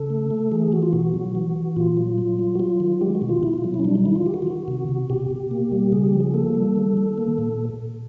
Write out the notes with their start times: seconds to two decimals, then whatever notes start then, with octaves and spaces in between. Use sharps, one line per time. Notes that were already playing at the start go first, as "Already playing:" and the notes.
Already playing: C#3 A4
0.10 A3
0.31 A3
0.52 E3 G#4
0.72 E3 F#4
0.82 F4
0.93 B2 F#4
1.14 F#3
1.35 E3
1.56 E3
1.76 A#2 F4
1.97 F#3
2.18 F#3
2.39 F#3
2.55 F#4
2.59 F#3 F4
2.80 D#3
3.01 G#3 G4
3.15 F#4
3.22 B2
3.29 F4
3.43 B2 E4
3.53 F4
3.64 F#3
3.74 E4
3.79 C#4
3.84 G3 D4
3.95 D#4
4.05 D#3 E4
4.16 F4
4.26 D#3 G4
4.34 F#4
4.42 F4
4.47 D#3 F#4
4.68 C3
4.89 C3
5.10 B2 G4
5.30 B2
5.51 A#3
5.72 G3
5.92 C#3 G#4
6.06 G4
6.13 F3
6.20 G#4
6.34 A#3 A4
6.55 G3
6.76 D#3
6.97 D#3
7.18 A#3
7.38 A#2